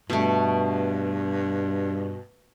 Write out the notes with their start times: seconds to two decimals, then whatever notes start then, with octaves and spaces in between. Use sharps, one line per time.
0.10 G2 B2 A3